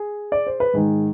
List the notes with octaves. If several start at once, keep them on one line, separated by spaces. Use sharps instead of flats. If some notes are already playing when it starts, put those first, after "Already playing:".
Already playing: G#4
D5
C5
B4
G#2 D#3 G#3 G#4